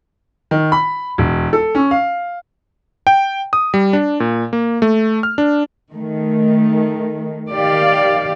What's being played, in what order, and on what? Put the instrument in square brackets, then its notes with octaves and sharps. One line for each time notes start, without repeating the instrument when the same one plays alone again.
[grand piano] D#3
B5
E1
A4
C#4
F5
[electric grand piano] G5
D#6
G3
D4
A#2
A#3
A3
F6
D4
[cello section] D#3 A3
D#3 G4 D5 F5